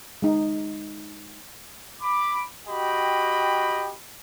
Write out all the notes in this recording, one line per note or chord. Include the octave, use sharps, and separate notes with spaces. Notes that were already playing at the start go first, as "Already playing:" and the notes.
G#3 D#4
B5 D6
F#4 G4 D#5 G5 B5